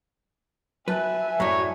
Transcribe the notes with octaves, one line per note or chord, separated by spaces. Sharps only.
F#3 B4 E5 G#5 A5 F#6
F#2 A2 C#5 D5 A#5